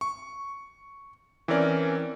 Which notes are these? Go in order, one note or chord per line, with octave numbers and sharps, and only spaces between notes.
C#6
E3 C4 C#4 A#4 D5